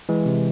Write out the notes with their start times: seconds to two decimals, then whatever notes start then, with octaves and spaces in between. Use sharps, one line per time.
0.09 E3 G#3
0.26 C3